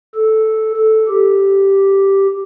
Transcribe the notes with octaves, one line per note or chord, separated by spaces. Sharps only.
A4
A4
G4